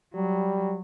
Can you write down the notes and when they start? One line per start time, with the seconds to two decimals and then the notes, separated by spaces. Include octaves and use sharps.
0.14 F#3 G3